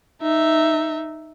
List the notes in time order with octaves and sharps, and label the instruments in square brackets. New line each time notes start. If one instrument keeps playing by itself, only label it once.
[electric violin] D#4 E5